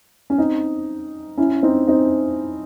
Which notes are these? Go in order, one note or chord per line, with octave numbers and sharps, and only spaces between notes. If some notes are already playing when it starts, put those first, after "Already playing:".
C#4
C4 D#4
C#4 E4
C4 D#4
C4 D#4